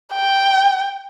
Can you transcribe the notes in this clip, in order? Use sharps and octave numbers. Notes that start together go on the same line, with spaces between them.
G5